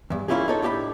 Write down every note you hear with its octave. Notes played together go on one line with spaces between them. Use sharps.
E2 G2
A#3 C#4 E4 F4 G4 G#4
D#4 A4 C#5
A2 D4 G4 G#5 B5